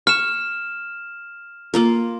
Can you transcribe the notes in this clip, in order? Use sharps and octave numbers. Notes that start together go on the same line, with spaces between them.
C#6 F6 E7
A#3 F4 A#4